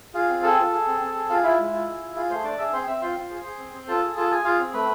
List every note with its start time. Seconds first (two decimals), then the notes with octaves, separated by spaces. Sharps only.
0.14 F4 G#4 F5
0.30 C4
0.43 G#4 A4 A5
0.58 F4
0.72 G#4
0.87 C4
1.01 C4
1.15 G#4
1.30 F4 G#4 F5
1.44 E4 F4 E5
1.59 G#3
1.72 F4
1.86 G#4
2.01 F4
2.15 F4 G#4 F5
2.30 A3 C5 C6
2.44 D4 D5 D6
2.58 G#4 E5 E6
2.73 C4 C5 C6
2.87 C4 E5 E6
3.02 F4 C5 C6
3.17 F4
3.31 G#4
3.45 G#4
3.59 C4
3.73 C4
3.87 F4 A4 A5
4.03 G#4
4.16 F4 A4 A5
4.31 G#4 G#5
4.45 F4 G#4 F5
4.59 C4
4.73 A3 B4 B5